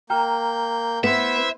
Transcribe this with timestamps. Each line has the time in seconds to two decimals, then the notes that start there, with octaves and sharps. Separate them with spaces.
0.10 A#3 G5 A#5 F6 G6
1.04 B3 E4 B4 C5 E5